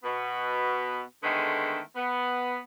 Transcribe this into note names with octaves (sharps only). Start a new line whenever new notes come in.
B2 B3
D3 D#3 G#3 A3 B3
B3